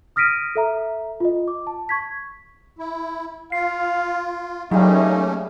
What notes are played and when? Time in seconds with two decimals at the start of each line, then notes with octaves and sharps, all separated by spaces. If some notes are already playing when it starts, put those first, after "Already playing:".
0.16 D#6 F6 A#6 B6 D7 D#7
0.55 A4 E5 A#5
1.20 F4 D#5
1.48 D6
1.67 A5
1.89 C#6 G#6 B6
2.79 E4
3.52 F4 F5 C7
4.71 F#3 G3 A3 A#3 C#4 D#4 E4 G#4